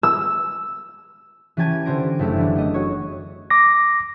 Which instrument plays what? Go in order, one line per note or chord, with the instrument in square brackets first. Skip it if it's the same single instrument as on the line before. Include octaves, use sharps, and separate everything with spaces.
[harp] E6
E3 C#4 G4 A5 G#6 D#7
D3 G4 C5 A#6 D7
F#1 A3 E4 G4
D3 E3 B3 D4
A3 D#5
F#4 C#5
[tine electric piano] D6 A#6